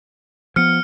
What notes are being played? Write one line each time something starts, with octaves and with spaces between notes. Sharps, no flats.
F3 B3 F6 C#7